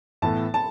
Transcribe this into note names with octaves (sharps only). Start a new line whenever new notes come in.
A2 E3 B3 A4 A5
A5